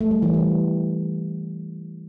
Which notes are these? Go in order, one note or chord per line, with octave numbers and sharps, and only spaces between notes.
A3
G3
E3
G3